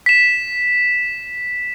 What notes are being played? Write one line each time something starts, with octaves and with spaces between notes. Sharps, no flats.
B6 E7